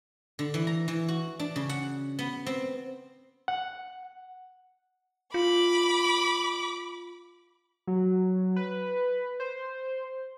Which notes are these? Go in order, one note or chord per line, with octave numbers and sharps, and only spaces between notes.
D3
E3
A#5
E3
F#4
D4
C#3
F#5
B3
C4
F#5
F4 B5 D6
F#3
B4
C5